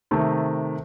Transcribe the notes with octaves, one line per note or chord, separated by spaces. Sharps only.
C3 D#3 A3